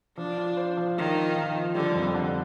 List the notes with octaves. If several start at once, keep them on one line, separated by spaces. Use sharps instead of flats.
F3 D4
F4
C5
F3
D#3 F4
F4
F3
F3
D3 G3
F2
D3